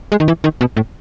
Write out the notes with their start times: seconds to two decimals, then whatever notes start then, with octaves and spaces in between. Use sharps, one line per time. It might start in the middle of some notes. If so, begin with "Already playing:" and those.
0.12 G#3
0.20 D#3
0.28 E3
0.44 D#3
0.61 B2
0.77 A2